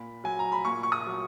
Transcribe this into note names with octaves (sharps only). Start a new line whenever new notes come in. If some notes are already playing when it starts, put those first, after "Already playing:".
Already playing: A#2 B5
F#3 G#5
A#5
B5
A#2 C#6
C#6
D#6
F#3